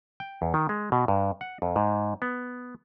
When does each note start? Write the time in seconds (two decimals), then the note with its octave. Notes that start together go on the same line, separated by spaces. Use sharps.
0.20 G5
0.42 E2
0.54 D#3
0.69 G#3
0.92 B2
1.08 G2
1.41 F#5
1.62 F2
1.76 G#2
2.22 B3